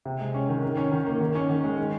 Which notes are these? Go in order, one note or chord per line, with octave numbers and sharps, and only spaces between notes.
C3
G#3
C#4
D#3
D#3
C#4
D#3
A#3
D#3
C#4
D#3
G#3
D#3